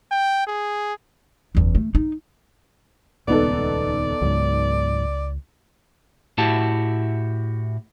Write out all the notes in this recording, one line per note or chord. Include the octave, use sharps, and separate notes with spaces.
G5
G#4
F#1 E2
A3
D#4
D#1 C#2 B3 D#4 A4 D5
C#2 G#2 F#3
A2 E4 F#4 G4 A5